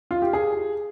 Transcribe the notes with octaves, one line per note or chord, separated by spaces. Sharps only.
F4
G4
G#4